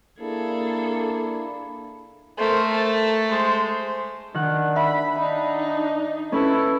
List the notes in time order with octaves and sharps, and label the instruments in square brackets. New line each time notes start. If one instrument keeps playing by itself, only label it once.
[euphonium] A#3 [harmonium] D4 E4 [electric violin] G#4 A4
[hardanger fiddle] A3 [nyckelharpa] A#4 C5
[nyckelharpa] A5
G#3 C5
[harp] D#3 F#5 F#6 [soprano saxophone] D4
[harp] E5 [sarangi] B5
[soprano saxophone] D4 [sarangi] D#4
[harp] C#4 B4 [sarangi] E4 [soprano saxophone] A4